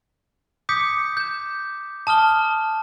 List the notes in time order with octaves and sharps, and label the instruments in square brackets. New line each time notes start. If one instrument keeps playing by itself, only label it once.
[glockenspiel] D6 D#6 G6 B6 C#7
G6 E7
A5 D#6 F6 G7